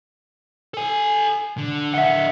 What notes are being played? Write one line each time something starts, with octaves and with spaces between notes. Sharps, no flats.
A4 G#5
D3
D3 D#5 E5 F#5